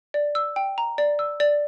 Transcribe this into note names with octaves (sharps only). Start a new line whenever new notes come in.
D5
E6
G5
A#5
D5
E6
D5